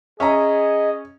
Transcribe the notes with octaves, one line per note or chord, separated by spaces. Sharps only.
C#4 G#4 D#5 E5 A#5